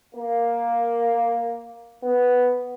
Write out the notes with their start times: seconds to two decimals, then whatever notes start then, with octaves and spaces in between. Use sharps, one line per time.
0.15 A#3
2.03 B3